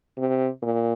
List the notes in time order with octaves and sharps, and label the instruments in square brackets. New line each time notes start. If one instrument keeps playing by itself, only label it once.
[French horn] C3
A#2